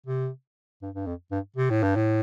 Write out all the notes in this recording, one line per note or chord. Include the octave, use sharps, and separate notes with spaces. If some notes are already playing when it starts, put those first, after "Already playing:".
C3
G2
G2
F2
G2
C3
A2
G2
A2